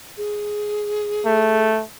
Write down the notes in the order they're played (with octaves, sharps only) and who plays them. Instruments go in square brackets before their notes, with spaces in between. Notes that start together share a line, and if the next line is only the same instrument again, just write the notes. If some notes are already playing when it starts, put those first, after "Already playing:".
[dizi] G#4
[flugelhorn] A3